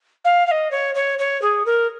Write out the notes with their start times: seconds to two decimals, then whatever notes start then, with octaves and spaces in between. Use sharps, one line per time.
0.25 F5
0.47 F5
0.51 D#5
0.71 C#5
0.95 C#5
1.19 C#5
1.42 G#4
1.66 A#4